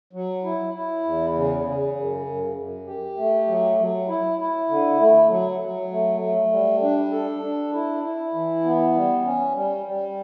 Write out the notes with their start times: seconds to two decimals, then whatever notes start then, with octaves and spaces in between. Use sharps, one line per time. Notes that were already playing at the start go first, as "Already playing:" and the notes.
0.13 F#3
0.44 E4
0.74 E4
1.04 E2
1.35 C#3
1.65 C#3
1.95 F#2
2.27 F#2
2.57 F#2
2.87 G4
3.17 A3
3.48 F#3
3.77 F#3
4.08 E4
4.39 E4
4.69 D3
4.99 A3
5.29 F#3
5.60 F#3
5.91 A3
6.21 A3
6.51 G3
6.82 D4
7.12 A4
7.43 D4
7.73 E4
8.03 E4
8.33 E3
8.64 B3
8.95 G3
9.25 C#4
9.55 G3
9.86 G3